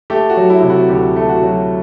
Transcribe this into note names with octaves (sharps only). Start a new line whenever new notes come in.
A3 G4
F#4
F#3
E4
C3 E4
F#4
D2 G4
A3
F#4
F#3